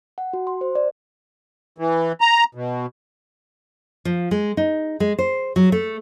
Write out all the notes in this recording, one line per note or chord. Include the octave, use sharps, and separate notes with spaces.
F#5
F#4
C6
C5
D5
E3
A#5
B2
F3
G#3
D#4
G#3
C5
F#3
A3